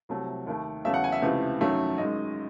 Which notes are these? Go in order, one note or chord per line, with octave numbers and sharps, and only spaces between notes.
C2 C3 F#3 A3
D#2 D#3 A3
E2 C#3 F#3 A3 E5
F#5
G#5
E5
C#2 C3 E3 A3
F#2 D#3 F#3 A3
F#2 D#3 G#3 D#5